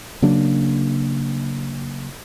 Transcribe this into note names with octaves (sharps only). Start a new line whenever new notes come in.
C#3 F#3 A#3 D4